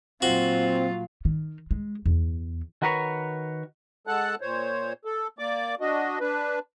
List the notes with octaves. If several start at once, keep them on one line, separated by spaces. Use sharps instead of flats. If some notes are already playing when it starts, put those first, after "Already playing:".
A#2 F#3 C4 F4 F#4
D#3
G#3
E2
D#3 F#4 A#4 B4 C#5
G#3 A4 F#5 A5 F#6
A#2 C5 C#5
A4
A#3 D5 D6
D4 F#4 D#5
D4 B4